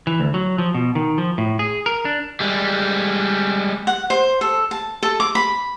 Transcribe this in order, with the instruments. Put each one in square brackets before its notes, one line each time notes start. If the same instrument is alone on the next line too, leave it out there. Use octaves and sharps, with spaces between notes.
[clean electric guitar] E3
D2
F#3
F3
B2
D#3
F3
A2
G#4
A#4
D4
[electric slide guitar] G3 G#3
[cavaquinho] F#5
C5
A4
A5
A4
D6
B5